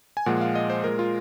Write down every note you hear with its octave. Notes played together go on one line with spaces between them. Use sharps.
G#5
A#2 F3 G#3 F#5
F5
D#5
C5
A#2 G#3 A#4
F4